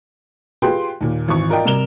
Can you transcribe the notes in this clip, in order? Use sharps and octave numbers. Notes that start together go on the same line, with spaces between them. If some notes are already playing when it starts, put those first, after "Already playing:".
F4 G4 G#4 B4 G5 C6
D#2 A#2
G#1 E3 C#6
F4 A#4 D5 D#5 G5
C3 G3 A#4 E7 F7 G7